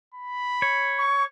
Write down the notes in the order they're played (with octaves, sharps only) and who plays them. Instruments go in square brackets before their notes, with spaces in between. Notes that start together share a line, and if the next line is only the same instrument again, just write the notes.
[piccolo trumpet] B5
[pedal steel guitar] C#5
[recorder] C#6